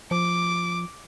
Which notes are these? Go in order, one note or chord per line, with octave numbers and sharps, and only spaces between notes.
F3 D6